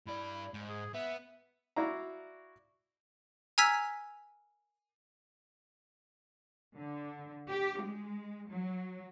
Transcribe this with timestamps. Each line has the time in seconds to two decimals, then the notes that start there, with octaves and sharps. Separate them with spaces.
0.07 G2 E4 D5
0.54 G#2
0.69 G#4
0.94 B3 E5
1.76 E4 F#4 D5 F5 A#5
3.58 G#5 A#5 E6 F6 G#6 B6
6.77 D3
7.50 G4
7.82 G#3
8.51 F#3